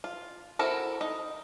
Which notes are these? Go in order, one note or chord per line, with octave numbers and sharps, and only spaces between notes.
F4
C4 E4 F#4 A4 A#4
D#4